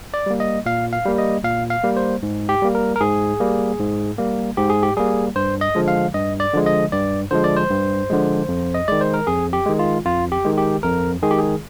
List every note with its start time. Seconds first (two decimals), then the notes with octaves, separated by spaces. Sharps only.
0.14 D5
0.26 G3 A#3
0.40 D#5
0.66 A#2 F5
0.93 F5
1.05 G3 A#3
1.18 D#5
1.44 A#2 F5
1.70 F5
1.84 G3 A#3
1.97 C5
2.23 G#2
2.49 G4
2.62 G3 A#3
2.75 A#4
2.96 A#4
3.01 G#2 G#4
3.40 G3 A#3
3.79 G#2
4.18 G3 A#3
4.57 G#2 G4
4.70 G#4
4.83 G4
4.97 G3 A#3 G#4
5.36 G2 C5
5.61 D#5
5.75 D3 F3 G#3
5.88 F5
6.14 G2 D#5
6.40 D5
6.53 D3 F3 G#3
6.66 D#5
6.92 G2 D5
7.31 D3 F3 G#3 C5
7.44 D5
7.56 C5
7.71 G2
8.10 D3 F3 G#3
8.48 F2
8.74 D#5
8.88 D#3 G#3 D5
9.01 C5
9.14 A#4
9.27 F2 G#4
9.53 G4
9.66 D#3 G#3
9.79 F4
10.05 F2 F4
10.32 G4
10.45 D#3 G#3
10.58 G4
10.83 F2 A#4
11.23 D#3 G#3 G#4
11.31 G4
11.38 G#4